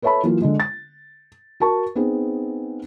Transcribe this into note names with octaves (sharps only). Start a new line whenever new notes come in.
A4 B4 C#5 E5 A5 B5
E3 F#3 A#3 F4
D3 G#3
A6
F#4 A#4 A5 C#6
B3 C4 D#4 G#4